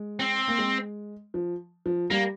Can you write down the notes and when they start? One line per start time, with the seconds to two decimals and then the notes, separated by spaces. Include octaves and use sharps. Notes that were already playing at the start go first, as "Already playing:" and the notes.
Already playing: G#3
0.19 C4
0.48 A#3
0.58 G#3
1.34 F3
1.86 F3
2.10 G3 A#3